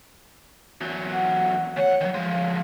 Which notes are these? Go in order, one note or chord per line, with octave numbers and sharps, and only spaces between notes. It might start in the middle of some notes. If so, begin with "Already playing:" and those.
E2 F#3
F#5
D2 C#5 F#5
D#3 F#3
F3 G#3 F5